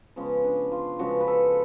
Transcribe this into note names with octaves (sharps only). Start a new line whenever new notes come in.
C#3 F3 G#3 B3 C#4
D4
F4
C#3 F3 G#3 B3 F#4
B4
A4